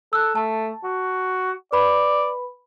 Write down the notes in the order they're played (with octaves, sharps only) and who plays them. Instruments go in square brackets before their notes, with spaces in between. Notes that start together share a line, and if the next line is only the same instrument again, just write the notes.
[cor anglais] A4 [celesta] E6 F#6
[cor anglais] A3 [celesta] A5
[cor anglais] F#4
[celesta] B4 B5 [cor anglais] D5